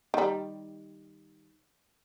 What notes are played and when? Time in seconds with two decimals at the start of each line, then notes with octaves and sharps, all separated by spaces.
0.14 D#3 G3